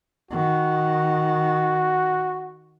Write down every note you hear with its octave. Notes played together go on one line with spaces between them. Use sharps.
D#3 F#4